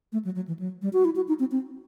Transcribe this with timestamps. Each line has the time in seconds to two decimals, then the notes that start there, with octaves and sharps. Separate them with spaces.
0.12 A3
0.25 F#3
0.35 F#3
0.48 E3
0.59 F#3
0.82 G3
0.93 F#4
1.05 E4
1.16 F#4
1.28 D#4
1.40 C4
1.51 C4